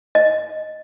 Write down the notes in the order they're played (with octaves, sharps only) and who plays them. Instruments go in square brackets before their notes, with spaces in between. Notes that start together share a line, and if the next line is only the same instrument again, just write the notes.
[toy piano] D#5